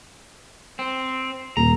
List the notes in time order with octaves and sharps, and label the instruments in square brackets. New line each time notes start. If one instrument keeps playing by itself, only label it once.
[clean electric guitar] C4
[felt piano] D#1 [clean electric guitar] A#5